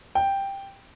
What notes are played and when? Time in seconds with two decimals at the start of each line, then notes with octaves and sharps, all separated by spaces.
0.15 G5